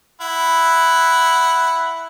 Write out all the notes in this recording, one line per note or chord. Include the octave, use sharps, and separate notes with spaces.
E4 F#5